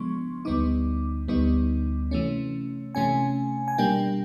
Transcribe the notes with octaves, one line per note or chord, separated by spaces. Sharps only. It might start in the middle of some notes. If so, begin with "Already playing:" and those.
Already playing: C#3 F3 G#3 B3 D4 C6 C#6
D2 D3 G3 B3 D#4 D6
D2 D3 G3 B3 D#4
C3 E3 A3 C#4
C3 E3 A3 C#4 G#5
G#5
B2 G3 A#3 D4 G5